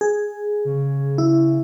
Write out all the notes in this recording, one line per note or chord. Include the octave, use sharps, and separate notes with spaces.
G#4
C#3
E4